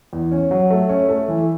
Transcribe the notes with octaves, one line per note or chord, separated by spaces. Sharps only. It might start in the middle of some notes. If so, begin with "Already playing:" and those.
E2
C#4
F#3
A3
C#4
A3
E3